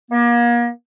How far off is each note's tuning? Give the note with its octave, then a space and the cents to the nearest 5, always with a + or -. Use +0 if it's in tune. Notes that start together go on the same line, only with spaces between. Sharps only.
A#3 +35